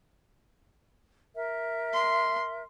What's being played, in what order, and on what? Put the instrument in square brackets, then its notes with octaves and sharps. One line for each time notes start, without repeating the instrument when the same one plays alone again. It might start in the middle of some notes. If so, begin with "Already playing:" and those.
[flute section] A#4 E5
[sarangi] C6